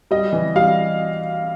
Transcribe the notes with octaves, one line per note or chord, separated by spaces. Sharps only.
G3 D#5
E3
G3 F5